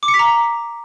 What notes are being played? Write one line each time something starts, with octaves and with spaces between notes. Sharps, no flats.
D6
C#7
B6
A#5